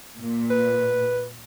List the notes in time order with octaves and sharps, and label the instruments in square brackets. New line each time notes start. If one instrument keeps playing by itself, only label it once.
[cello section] A#2
[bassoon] B4